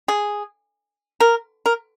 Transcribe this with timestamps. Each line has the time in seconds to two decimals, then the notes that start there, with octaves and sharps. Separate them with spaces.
0.08 G#4
1.20 A#4
1.66 A#4